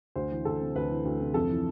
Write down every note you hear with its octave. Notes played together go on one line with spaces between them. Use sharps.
D2 C5
E3
D2 A4
C3
D2 B4
E3
D2
C3
F2 A4
E3